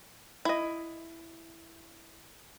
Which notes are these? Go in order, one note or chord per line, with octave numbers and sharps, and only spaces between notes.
E4 D#5